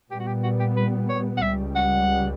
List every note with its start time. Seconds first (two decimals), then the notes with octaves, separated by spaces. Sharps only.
0.10 A#2 G3 B3 G4
0.19 F#4
0.27 G4
0.43 F#4
0.60 G4
0.76 B4
1.09 C#5
1.37 F#5
1.42 C#2 C#3 G3 E5
1.75 F#5